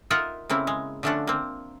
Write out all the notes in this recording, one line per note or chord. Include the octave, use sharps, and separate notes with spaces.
D#4 F4 A#4 D#5 E5 F#5
C#3 A#3 C4 E4
G#3
D3 F3 A3 C#4 D4 F#5
A#3 C4